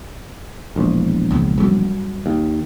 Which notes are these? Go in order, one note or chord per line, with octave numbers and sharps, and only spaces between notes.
E1 A#1
C#2 C#3
F#2 G3
D#2